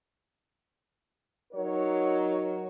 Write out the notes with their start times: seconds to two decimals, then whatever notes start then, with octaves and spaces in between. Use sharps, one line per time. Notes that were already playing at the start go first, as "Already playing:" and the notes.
1.53 F#3 D#4 A#4 C#5